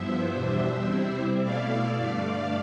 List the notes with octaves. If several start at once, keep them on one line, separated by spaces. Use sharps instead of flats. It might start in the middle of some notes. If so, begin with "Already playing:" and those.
Already playing: G2 F3 B3 E4 C5 E5
E2 B2 G3 D4
C3 G3 C4 E4
B2 A3 E4 D5 F5
G2 D3 A3